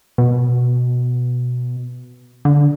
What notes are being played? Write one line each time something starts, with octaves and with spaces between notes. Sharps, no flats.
B2
D3